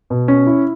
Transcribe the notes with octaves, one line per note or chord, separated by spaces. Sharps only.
B2
C#4
E4